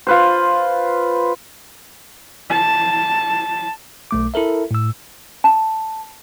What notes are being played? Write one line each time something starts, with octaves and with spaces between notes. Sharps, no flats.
F4 B4 C5
A5
B1 A3 D6
E4 A4 A#4 E5
A2 E6
A5